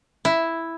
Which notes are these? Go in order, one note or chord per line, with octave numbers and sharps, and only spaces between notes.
E4